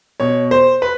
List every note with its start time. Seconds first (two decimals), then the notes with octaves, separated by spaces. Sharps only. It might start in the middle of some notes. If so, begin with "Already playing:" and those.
0.20 B2 C#5
0.51 C5
0.82 B4